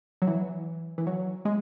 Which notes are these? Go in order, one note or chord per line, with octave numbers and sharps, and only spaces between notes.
F#3
E3
E3
F#3
G#3